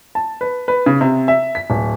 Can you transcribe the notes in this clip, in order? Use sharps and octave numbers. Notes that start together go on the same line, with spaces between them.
A5
B4
B4
C#3
C3
E5
B6
D1